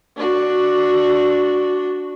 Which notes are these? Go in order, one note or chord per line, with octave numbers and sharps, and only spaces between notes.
D4 F#4